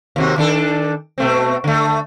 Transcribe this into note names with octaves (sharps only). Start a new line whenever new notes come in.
D#2 C3 F#4
D#3 D4 A4
B2 A3 C4
D3 A3